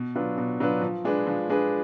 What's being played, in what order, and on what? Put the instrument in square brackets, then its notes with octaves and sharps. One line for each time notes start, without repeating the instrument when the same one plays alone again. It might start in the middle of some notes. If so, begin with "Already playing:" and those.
Already playing: [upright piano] B2
F#3 D4 F4 B4
B2
F#3 D4 F4 B4
F3
G#3 D4 G#4 B4
F3
G#3 D4 G#4 B4